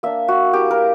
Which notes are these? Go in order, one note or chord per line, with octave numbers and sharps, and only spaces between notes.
A#3 D4 E5
F#4
A#3 E4 G4
A#4